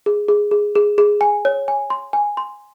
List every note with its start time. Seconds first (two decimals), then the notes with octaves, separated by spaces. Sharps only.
0.06 G#4
0.29 G#4
0.51 G#4
0.75 G#4
0.98 G#4
1.21 G#5
1.45 C#5
1.68 G#5
1.90 C6
2.13 G#5
2.37 C6